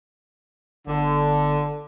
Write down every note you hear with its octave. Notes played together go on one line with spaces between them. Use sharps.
G1 D3